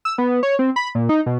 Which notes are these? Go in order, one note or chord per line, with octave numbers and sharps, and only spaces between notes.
E6
B3
C#5
C4
B5
A#2
D#4
B2